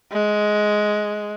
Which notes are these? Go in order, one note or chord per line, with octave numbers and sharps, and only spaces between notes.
G#3